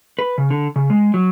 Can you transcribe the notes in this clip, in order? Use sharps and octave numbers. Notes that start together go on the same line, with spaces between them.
B4
C#3
D3
C#3
G#3
F#3